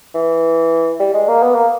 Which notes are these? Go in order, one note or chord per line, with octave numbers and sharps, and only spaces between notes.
E3
G3
G#3
A#3
B3
A#3